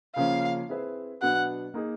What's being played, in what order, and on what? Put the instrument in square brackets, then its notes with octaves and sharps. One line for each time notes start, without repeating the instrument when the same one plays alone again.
[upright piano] C#3 F3 A#3 C#4 [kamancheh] F5
[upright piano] C4 E4 G#4 B4 E5
[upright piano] B2 F#3 B3 D4 [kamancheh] F#5
[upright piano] A#3 D#4 G#4